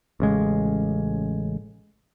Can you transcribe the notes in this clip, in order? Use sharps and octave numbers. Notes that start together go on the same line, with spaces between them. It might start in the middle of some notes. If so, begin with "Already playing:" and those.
A1 C#3 G#3